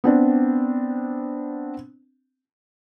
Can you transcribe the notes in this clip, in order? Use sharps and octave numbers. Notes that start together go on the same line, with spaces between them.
B3 C4 D4